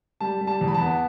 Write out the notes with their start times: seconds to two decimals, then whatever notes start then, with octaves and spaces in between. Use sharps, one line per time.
0.21 G3 A5
0.41 G3
0.47 A5
0.61 E2
0.68 B5
0.74 A5
0.81 B3